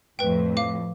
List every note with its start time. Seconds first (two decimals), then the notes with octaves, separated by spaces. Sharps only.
0.19 F2 A2 B4 G5
0.57 F5 D6